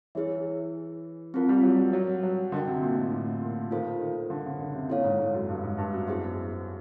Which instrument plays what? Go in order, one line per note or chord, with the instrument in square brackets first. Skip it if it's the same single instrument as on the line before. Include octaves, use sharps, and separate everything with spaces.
[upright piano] E3 [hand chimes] E4 G#4 C#5 E5
[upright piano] F3 [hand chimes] C4 F4 A#4
[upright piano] G3
F#3
F#3
F#3
F#3
[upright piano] D3 [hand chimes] F#4 A#4 D#5 G5
[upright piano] C3
A#2
A2
A2
A#2
[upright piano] D#3 [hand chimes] F4 A4 C5 F5
[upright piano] D#3
D3
C#3
C#3
C3
[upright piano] A#2 [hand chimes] E4 A4 C#5 F5
[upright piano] G#2
G#2
F#2
G2
G#2
G2
F#2
[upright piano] F#2 [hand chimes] B3 E4 G#4 C5 E5